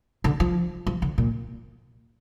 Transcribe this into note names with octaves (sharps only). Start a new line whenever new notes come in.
D3
F3
F3
D3
A#2